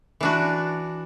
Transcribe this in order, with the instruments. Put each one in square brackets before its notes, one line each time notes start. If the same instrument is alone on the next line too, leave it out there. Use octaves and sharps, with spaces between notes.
[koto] E3 D4 F#4